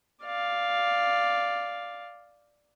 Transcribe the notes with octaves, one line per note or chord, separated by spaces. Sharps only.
D5 F5